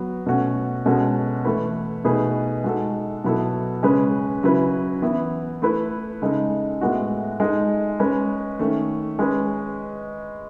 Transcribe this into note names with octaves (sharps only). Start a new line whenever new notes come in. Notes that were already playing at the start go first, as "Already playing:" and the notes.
Already playing: F#3 B3
B2 A3 C#4 F#4
B2 G#3 C#4 F#4 A4
E3 A3 E4 B4
B2 A3 D#4 G#4 B4
G#3 D#4 F#4 A4
B2 F#3 B3 E4 A4
C#3 G#3 C#4 G#4 B4
C#3 F#3 C#4 E4 B4
E3 B3 E4
A3 E4 B4
C#3 G#3 D#4 A4
A2 G#3 B3 F#4
G#3 D#4 A4
G#3 C#4 G#4 B4
D#3 A3 C#4
G#3 C#4 G#4 B4